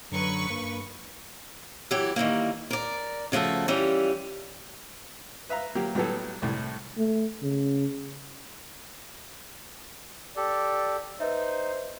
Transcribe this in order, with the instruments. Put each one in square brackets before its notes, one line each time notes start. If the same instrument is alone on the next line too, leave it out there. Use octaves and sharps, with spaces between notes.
[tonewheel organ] F#2 D3 [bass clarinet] F#3 [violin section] B4 C#6
[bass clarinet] G2 [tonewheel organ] A#3
[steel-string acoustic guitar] E3 F#3 E4 G4
D#3 E3 G3 A#3
A#4 D5
C#3 F3 A3 F#4 A4
E3 G3 C#4 F4 G4
[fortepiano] B4 E5 F5 A#5
F#3 A#3 G4
A2 F#3 G3 B3 G4 A4
C2 A2
[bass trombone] A3
C#3
[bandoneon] G4 A4 [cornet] D5
[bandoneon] D#4 [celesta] B4 D#5 E5 [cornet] C5